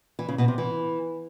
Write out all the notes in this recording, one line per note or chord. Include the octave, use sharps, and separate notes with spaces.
E3
C#3
B2
C3
E3